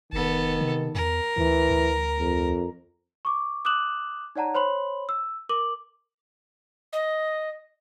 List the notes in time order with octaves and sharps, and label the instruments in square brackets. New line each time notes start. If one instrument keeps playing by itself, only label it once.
[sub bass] F1 [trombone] D#3 [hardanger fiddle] B3 A4
[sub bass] C3
[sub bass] E2 [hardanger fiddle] A#4
[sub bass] D2 [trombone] E3
[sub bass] D2
[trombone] F2
[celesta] C#6 D6
D6 D#6 F#6 E7 F#7
D#4 C#5 D5 F#5 A5 A#5
C5 C#5 B5 C6 F#7
E6
A#4 D6 F#7
[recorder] D#5